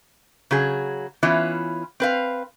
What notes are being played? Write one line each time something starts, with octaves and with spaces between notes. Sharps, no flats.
C#3 F#3 G#4
E3 B3 C#4 E4 F4
C4 B4 F5